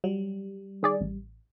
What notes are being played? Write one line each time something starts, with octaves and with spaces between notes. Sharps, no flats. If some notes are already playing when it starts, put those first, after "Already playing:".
F#3 G3
D#3 G#4 D5
A1